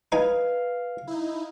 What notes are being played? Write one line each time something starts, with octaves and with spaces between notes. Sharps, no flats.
D#4 B4 F5 G#5
D#4 E4